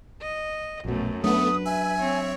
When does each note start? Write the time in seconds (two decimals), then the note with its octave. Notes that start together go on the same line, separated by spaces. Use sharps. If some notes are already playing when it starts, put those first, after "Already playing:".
0.21 D#5
0.85 A#1 F#2 B2 A3
1.24 F#3 A3 B3 D4 B4 D#6
1.65 E5 G#5
1.99 C4 C#5